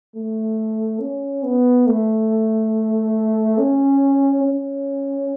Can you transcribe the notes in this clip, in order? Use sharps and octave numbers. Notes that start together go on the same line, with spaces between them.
A3
C#4
B3
A3
C#4
C#4